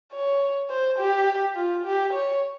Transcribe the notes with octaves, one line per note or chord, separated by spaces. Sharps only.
C#5
C5
G4
F4
G4
C#5